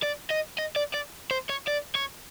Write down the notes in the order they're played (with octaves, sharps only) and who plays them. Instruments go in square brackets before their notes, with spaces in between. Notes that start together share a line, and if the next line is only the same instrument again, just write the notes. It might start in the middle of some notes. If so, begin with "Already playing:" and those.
[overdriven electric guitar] D5
D#5
D#5
D5
D5
C5
C#5
D5
C#5